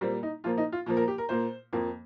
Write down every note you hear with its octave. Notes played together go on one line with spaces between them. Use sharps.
A#2 G3 A#3 C4
D#4
A#2 F3 A#3 F4
D#4
F4
A#2 F3 A#3
A#4
G4
A#4
A#2 A#3 C5
F2 F3 A#3